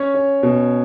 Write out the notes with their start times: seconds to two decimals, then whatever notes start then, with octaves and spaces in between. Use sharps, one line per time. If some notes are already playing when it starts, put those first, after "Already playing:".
Already playing: C#4 C#5
0.15 C#4
0.43 B2